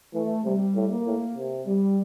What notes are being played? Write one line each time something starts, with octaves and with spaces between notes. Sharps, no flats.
E3 A3
C3 G3
A2
A#3
A2
C3
G3